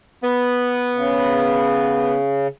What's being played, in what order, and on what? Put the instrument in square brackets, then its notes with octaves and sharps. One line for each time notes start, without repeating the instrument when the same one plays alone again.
[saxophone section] B3
[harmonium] C#3